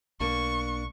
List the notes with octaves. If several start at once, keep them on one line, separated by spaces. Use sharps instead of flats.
B1 A#3 D4 C#6